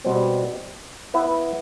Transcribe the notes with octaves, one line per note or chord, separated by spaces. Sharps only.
B2 G3 C4
B3 E4 B4